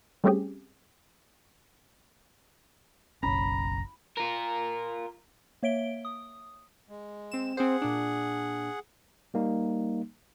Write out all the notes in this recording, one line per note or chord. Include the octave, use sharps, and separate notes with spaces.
G3 A3 C4 C#4 G4 G#4
F#1 B1 C#4 A#5 B5
F4 A#4
A#3 C#5 E5 D7 G7
D#6
G#3
C4 E7
C4 G#4 C5 F#5
A#2 D4
G3 A#3 D#4